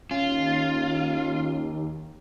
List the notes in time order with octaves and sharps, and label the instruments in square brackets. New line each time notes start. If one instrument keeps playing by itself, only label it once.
[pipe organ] D#2 [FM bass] C#4 [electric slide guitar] F4